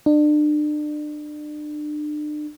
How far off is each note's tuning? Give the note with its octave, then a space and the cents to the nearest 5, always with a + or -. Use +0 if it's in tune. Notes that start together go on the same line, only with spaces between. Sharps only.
D4 +35